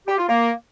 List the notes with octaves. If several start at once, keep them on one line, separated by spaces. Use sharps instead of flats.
G4
F4
A#3